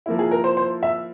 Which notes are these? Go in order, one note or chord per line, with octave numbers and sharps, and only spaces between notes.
F3 A#3 E4
G#4
A#4
C5
C5
E5